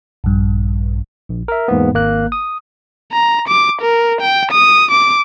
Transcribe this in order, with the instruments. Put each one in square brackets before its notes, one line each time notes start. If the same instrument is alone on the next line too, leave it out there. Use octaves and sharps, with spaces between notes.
[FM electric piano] A#1 G2
[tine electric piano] A#1
A#4 E5
E2 G#2 A#3 B3
G#1 A#3 F#6
D#6
[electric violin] A#5
D6
A#4
G5
D#6
D6